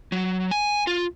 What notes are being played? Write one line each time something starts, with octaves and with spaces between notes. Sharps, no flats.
F#3
G#5
F4